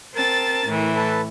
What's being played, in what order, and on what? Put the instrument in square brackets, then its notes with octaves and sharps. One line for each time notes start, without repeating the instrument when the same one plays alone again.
[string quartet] C4 A5 A6 [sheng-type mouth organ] A#4
[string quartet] A2 E3
[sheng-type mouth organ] A4 B4 A5